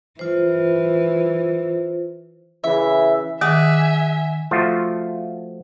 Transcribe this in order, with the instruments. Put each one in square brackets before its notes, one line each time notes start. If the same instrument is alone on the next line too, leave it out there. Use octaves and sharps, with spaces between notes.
[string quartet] E3 [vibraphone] F4 C5
[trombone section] C#3 E3 [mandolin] E5
[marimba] D#3 [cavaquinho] G#4 F#5 D6 [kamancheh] E5 G#5
[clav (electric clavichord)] F3 A3 F4 F#4